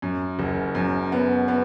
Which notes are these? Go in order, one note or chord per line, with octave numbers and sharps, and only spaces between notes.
F#2
F#1
F#2
B3
B3